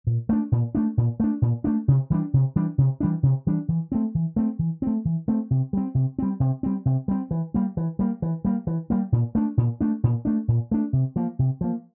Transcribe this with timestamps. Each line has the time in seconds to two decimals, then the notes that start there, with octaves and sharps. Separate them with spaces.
0.07 A#2
0.29 A3 D4
0.52 A#2
0.75 A3 D4
0.97 A#2
1.20 A3 D4
1.42 A#2
1.64 A3 D4
1.88 C3
2.10 E3 G3 D4
2.34 C3
2.56 E3 G3 D4
2.78 C3
3.00 E3 G3 D4
3.23 C3
3.47 E3 G3 D4
3.68 E3
3.92 A3 C4
4.15 E3
4.36 A3 C4
4.59 E3
4.82 A3 C4
5.05 E3
5.28 A3 C4
5.51 C3
5.73 G3 C4
5.95 C3
6.19 G3 C4
6.40 C3
6.63 G3 C4
6.85 C3
7.08 G3 C4
7.31 E3
7.54 G3 A#3
7.77 E3
7.99 G3 A#3
8.22 E3
8.45 G3 A#3
8.67 E3
8.90 G3 A#3
9.12 A#2
9.35 A3 D4
9.57 A#2
9.81 A3 D4
10.04 A#2
10.25 A3 D4
10.48 A#2
10.71 A3 D4
10.93 C3
11.16 F3 A#3
11.39 C3
11.61 F3 A#3